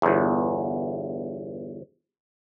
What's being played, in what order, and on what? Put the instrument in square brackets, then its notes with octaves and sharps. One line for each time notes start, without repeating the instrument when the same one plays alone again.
[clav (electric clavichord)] G1 E2